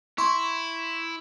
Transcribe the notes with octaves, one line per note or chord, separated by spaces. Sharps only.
E4 C6 C#6